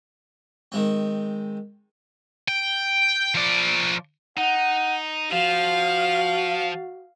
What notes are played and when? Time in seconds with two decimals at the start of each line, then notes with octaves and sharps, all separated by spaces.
0.72 D#3 G#3 C4
2.49 G5
3.35 F3 D5
4.37 D#4 F#5
5.32 F3 F#4 F5